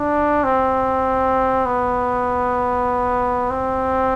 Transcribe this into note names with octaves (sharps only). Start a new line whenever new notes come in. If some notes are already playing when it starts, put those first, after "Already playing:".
Already playing: D4
C4
B3
C4